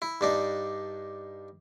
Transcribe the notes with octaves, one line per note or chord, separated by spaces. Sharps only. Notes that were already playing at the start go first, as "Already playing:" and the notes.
E4
G2 D4 D#4